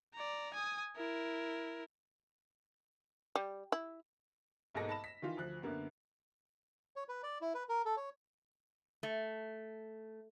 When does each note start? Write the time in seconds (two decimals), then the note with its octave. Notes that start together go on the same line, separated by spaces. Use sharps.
0.14 D5 A#5
0.54 G#5 D#6
0.96 E4 A#4
3.35 G3
3.72 E4
4.75 B1 G#2 G#3 A#3 A4 A#6
4.89 A5 B5 E7
5.04 B6
5.22 D#3 E3 F4
5.37 D2 F3 F#6
5.62 F#2 D3 A#3 B3
6.96 C#5
7.09 B4
7.23 D5
7.41 E4
7.54 B4
7.69 A#4
7.86 A4
7.97 C#5
9.03 A3